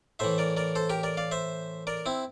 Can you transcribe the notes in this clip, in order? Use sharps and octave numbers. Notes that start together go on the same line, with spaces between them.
A2 E3 C5 E5
A#4 D5
A#4 D5
A4 C5
G4 A#4
A#4 D5
D5 F5
C5 E5
A#4 D5
C4 E4